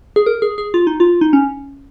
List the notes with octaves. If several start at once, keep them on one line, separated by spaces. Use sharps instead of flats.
G#4
A#4
G#4
G#4
F4
D#4
F4
D#4
C#4